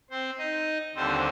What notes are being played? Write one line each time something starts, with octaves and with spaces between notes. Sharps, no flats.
C4 C5
D#4 D#5
D#2 D3 G3 C4 C5